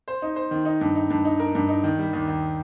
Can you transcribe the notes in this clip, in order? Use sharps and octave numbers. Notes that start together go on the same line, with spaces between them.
C5
D#4
C5
D#3
D#4
G2
D#4
G2
D#4
A#4
G2
D#4
D#3
G3
D#2
D#2